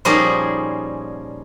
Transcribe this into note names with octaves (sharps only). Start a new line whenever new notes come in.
A#2 F3 G3 C#4 D#4 G#4